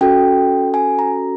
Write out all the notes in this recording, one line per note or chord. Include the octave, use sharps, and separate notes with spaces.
C#4 F#4 A4 G5
G#5
A#5